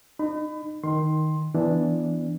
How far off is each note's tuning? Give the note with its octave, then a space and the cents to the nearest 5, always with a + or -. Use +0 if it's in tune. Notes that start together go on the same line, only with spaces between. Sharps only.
D#4 -30 B5 +25
D#3 +0 C6 +15
E3 +0 B3 +0 D4 +0